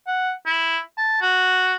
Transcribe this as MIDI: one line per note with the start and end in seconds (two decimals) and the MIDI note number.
0.07 0.32 78
0.46 0.79 64
0.98 1.21 81
1.22 1.75 66